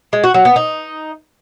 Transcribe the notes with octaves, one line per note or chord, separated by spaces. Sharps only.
G#3
F#4
F#3
B3
D#4